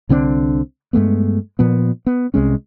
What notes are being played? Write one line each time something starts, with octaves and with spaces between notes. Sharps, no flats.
C2 D3 C4 D4
G2 G#3 A3 B3
A#2 F3 B3
B3
C2 C3 G#3 C#4